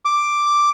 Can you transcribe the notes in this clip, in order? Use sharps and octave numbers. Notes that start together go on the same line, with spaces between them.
D6